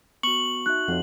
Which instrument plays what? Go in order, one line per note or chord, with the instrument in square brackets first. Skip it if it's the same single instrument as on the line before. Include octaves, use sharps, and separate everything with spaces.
[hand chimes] B3 F#4 [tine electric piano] C#6 [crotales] F#7
[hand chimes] D#4 F#4 E5 [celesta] F#6
[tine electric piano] F2 [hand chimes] C#5 E5 F#5